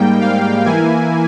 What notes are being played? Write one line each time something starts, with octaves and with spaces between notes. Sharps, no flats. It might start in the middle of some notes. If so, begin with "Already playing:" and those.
Already playing: G#2 G3 A#3 G5
F5
E3 A#3 E4 G#5